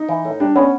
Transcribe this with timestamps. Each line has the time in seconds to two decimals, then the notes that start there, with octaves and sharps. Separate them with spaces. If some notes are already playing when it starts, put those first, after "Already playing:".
Already playing: D#4
0.08 E3
0.25 A2
0.40 G3 D4
0.56 B3 C#4